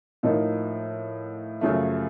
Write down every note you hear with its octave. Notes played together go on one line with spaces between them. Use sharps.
A2 F3 A#3 D#4
F#2 C#3 F3 A3